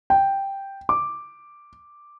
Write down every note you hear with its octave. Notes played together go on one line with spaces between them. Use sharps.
G5
D6